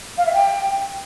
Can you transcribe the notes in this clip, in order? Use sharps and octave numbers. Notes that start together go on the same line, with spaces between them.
F5
E5
G5